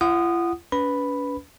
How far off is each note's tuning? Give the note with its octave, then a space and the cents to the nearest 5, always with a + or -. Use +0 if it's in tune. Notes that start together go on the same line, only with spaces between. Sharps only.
F4 -45 F#5 +0 D#6 -15
C#4 +45 B4 +0 B5 +0